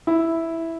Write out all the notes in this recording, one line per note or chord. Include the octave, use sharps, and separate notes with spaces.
E4